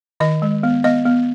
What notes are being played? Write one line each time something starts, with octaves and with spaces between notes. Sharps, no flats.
D#3 D#5
G#3
B3
B3 D#5
B3